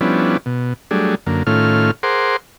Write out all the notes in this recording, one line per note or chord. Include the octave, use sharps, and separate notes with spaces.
F3 G3 B3 C#4 D4 E4
B2
F#3 G3 A3 D4 G#4
F#2 D3 A#3
A2 D#3 A3 C#4 F4 F6
G#4 A#4 C5 F#5 C6 D6